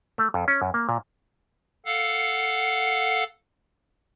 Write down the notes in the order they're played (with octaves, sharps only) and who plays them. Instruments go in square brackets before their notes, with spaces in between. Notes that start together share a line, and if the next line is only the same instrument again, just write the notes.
[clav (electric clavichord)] A3
F2
C#4
F#2
A#3
A#2
[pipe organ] A4 F5 F#5